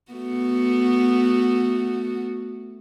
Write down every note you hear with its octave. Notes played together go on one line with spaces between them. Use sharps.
A3 B3 F#4